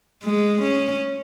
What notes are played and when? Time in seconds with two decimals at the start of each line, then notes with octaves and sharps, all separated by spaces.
0.24 G#3
0.62 C#4